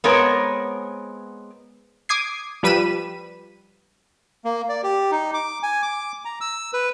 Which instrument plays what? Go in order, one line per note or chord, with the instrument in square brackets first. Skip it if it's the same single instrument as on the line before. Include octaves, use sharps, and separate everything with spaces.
[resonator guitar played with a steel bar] G#3 B3 C4 A#4 C#5
[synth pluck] D6 D#6 G#6 C7
F3 G3 B4 B5 D#7 E7
[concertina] A#3
D5
G4
D#4
D6
G#5
D6
A#5
E6
B4